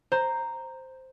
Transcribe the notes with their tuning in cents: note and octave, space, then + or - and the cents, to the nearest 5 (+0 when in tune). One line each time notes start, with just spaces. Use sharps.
C5 +0 A#5 -5